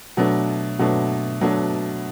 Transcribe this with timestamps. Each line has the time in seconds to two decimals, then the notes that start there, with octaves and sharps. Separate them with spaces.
0.17 B2 F#3 A3 D4
0.79 B2 F#3 A3 D4
1.41 B2 F#3 A3 D4